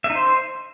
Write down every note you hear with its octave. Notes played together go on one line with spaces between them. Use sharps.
E5
D#4
C5